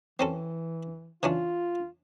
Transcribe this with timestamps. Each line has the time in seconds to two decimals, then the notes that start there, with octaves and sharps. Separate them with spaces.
0.19 E3 C4 C#4 A4
1.23 E3 C#4 D4 F4